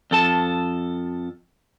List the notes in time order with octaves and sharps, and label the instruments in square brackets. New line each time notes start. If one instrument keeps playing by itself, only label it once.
[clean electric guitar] F2 A4 A5